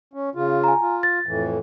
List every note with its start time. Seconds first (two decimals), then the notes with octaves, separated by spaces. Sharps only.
0.14 C#4
0.35 C#3 F4
0.64 G#5 A#5
0.82 F4
1.03 A6
1.26 F2 A2 E3